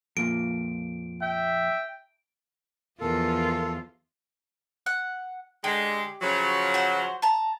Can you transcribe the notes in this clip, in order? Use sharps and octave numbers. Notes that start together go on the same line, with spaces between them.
F2 A#2 A#3 D7
E5 G5
E2 F3 F4 A4 A#4
F#5
D3 G#3 G4
C#3 F3 F#3
F#4 C5
A5 A#5